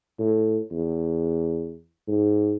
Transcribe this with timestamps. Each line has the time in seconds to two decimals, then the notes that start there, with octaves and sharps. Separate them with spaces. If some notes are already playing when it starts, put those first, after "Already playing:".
0.19 A2
0.71 E2
2.08 G#2